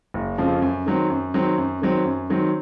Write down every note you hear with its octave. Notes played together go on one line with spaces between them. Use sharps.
F#1
F2 C#3 F3
F#2
D#3 F#3 C4
F#2
D#3 F#3 C4
F#2
D#3 F#3 C4
F#2
D#3 F#3 C4